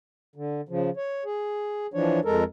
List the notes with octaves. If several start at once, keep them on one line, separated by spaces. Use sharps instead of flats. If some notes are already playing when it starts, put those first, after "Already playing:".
D3
C#3 F3
C#5
G#4
E3 F3 D4 C#5
F2 G#3 A4 A#4